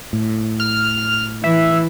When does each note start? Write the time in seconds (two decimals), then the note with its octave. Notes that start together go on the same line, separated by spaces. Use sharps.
0.13 A2
0.60 F6
1.44 E3 E5